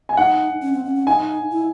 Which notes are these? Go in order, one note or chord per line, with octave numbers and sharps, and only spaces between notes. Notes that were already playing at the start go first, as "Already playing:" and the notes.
G#5
D#4 F#5
C#4
C4
C#4
C#4
D#4 G#5
E4